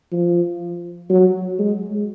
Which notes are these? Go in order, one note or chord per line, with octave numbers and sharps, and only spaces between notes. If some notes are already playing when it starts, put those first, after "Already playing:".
F3
F#3
G#3